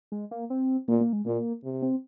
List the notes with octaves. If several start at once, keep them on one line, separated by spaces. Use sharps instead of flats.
G#3
A#3
C4
A#2 A#3
A#3
G#3
A#2 A#3
C3
C4